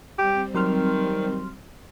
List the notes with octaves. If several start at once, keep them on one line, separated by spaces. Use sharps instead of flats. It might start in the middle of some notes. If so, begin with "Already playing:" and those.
G3 C4 G4
D#3 F#3 C6 F6